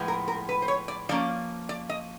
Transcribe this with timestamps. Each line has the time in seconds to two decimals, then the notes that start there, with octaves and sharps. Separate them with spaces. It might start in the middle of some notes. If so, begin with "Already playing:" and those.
Already playing: A2 F3 G#3 B3
0.08 A#4
0.28 A#4
0.49 B4
0.62 C5
0.68 C#5
0.88 D5
1.09 F3 A#3 C#4 D5
1.69 D5
1.89 D#5